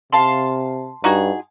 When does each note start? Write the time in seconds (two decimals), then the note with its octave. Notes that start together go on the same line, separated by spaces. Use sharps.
0.13 C3 F5 A5 C6
1.04 G2 D#4 F#4 G#4